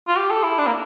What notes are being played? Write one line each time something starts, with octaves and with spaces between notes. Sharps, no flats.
F4
G4
A4
E4
D4
A#3